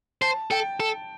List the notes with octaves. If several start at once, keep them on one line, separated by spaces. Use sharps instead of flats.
C5 A5
A4 G5
A4